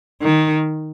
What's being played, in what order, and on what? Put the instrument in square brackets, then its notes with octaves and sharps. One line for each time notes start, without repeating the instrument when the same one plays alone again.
[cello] D#3